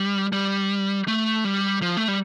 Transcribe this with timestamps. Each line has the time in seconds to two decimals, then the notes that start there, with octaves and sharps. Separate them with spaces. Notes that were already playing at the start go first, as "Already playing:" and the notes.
Already playing: G3
0.33 G3
1.08 A3
1.45 G3
1.82 F3
1.97 A3
2.08 G3